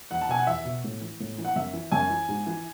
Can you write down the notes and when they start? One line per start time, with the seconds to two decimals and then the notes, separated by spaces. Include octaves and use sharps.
0.11 E2 F#5
0.21 A5
0.29 B2 G#5
0.39 F#5
0.47 E2 E5
0.65 B2
0.84 A2
1.01 E3
1.20 A2
1.38 E3
1.45 F#5
1.56 F#2 E5
1.73 E3
1.92 F#2 G#5
2.10 E3
2.28 G#2
2.47 E3